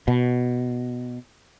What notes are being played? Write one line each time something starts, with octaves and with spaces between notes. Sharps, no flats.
B2